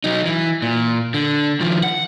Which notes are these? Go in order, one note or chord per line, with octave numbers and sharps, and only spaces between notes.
F#3 D#4
E3
A#2
D3
D#3 F3
F#5